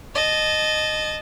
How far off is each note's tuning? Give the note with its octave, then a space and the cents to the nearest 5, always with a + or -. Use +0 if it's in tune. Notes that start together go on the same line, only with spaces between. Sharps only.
D#5 -15 A5 -20